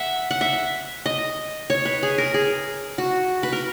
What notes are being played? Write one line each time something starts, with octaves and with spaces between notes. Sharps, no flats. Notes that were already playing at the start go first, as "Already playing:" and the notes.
Already playing: E5 F#5
F#5
E5
D#5
C#5
B4
G#4
A#4
G#4
F#4
B4
A#4